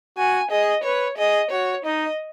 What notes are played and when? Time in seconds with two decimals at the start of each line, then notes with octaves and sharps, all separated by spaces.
0.17 F#4 G#5
0.51 G#4 D#5
0.84 B4 C#5
1.18 G#4 D#5
1.51 F#4 C#5
1.85 D#4 D#5